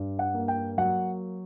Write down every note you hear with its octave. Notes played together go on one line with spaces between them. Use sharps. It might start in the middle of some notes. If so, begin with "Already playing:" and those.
Already playing: G2
F#5
A#3
G5
F#3 F#5